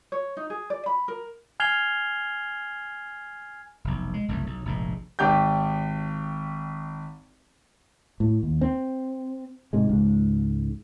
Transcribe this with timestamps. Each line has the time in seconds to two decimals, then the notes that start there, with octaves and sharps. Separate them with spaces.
0.12 C#5
0.37 D#4
0.50 G#4
0.70 D5
0.86 B5
1.08 A#4
1.60 G#5 F6 G#6 C7 F7 G7
3.84 F1 B1
4.14 G#3
4.28 F#1 C2 F#2 A3
4.47 B1
4.65 F1 A#1 G#2
5.19 G#1 G4 G6
8.20 A2
8.43 D#2
8.61 C4
9.73 G#2 C3 G#3
9.89 C#2 G#2